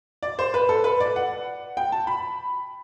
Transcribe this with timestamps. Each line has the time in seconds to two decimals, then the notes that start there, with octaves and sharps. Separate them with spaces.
0.23 D5
0.39 C5
0.54 B4
0.69 A4
0.84 B4
1.00 D5
1.16 F#5
1.77 G5
1.92 A5
2.07 B5